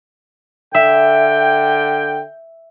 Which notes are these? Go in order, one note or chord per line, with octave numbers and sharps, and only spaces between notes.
D3 E5 G5